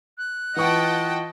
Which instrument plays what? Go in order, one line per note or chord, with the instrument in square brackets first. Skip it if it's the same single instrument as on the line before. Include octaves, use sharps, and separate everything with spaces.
[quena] F#6
[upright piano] E3 C#6 [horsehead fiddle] F4 D#5 [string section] F#5 G5 A5